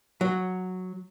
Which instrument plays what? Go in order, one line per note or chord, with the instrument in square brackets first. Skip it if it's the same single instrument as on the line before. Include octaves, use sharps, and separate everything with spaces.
[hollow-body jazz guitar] F#3